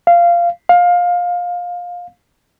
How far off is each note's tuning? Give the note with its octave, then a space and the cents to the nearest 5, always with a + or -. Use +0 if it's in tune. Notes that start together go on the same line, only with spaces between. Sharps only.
F5 -15
F5 +20